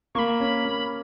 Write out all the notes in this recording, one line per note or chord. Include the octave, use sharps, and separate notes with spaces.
A#3 B5 C#6
C#4
A#3